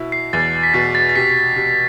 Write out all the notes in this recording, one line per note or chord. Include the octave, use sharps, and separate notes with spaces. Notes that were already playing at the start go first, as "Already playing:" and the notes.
Already playing: B2 E4
C7
E2 A6
B6
B2 A6
A6
A6
C3 B6
C3